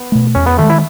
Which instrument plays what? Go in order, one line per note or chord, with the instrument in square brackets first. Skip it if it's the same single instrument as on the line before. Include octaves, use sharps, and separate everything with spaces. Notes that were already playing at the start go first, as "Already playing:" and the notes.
Already playing: [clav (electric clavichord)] B3
[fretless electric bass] B2 A3
[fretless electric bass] E2 [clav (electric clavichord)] C#4
[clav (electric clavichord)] B3
[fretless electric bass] D#3 G#3 [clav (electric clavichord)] A3
[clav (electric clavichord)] E4